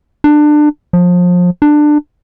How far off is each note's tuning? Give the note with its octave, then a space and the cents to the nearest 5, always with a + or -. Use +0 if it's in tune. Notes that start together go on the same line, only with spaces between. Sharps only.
D4 +25
F3 +30
D4 +20